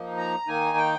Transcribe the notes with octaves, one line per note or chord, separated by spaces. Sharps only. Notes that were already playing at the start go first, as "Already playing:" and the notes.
Already playing: F3 A#3 D#4
A#5
D#3 A#3 D#4 G#5
G5